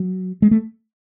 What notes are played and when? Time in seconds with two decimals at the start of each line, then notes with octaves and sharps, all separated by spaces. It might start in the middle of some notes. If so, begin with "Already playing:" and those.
Already playing: F#3
0.42 G#3
0.51 A3